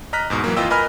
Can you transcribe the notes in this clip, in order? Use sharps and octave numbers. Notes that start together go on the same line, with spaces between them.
D#5 A#5 F6 F#6 B6
E2 G#2 B2
E3 F#3 A#3
F2 E3 F4 D#5 G5 E6
A#4 B4 D#5 G#5 B5 F6